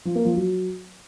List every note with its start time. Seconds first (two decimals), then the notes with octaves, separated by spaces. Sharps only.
0.05 F3
0.15 A#3
0.25 F3
0.35 F#3